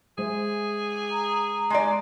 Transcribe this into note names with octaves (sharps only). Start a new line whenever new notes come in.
G#3 G#4 C5 E5
A#5
G#3 D#4 D5